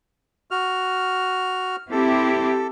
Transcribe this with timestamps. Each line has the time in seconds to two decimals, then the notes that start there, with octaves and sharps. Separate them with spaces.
0.51 F#4 F6
1.92 C4 E4 G4 A4